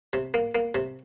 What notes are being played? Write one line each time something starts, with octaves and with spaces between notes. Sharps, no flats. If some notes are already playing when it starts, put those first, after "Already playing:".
C3
A#3
A#3
C3